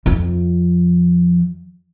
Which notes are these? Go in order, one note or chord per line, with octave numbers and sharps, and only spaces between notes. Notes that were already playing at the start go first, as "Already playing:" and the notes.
F2 F3